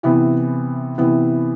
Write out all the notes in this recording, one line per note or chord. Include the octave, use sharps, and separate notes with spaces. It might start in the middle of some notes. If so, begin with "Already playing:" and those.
C3 E3 B3 E4
C3 E3 B3 E4